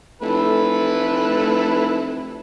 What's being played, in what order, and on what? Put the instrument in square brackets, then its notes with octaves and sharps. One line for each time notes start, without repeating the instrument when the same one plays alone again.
[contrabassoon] F1 [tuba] A3 [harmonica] E4 A4 B4